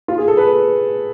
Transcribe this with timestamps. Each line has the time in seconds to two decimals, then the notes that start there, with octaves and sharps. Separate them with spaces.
0.08 F4
0.18 G#4
0.28 A4
0.37 B4